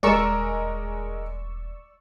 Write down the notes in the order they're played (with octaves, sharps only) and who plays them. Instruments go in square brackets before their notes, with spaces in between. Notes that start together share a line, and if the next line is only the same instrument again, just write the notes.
[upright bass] D#1 E2 [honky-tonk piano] G#3 A#4 [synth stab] D5 C#6 E6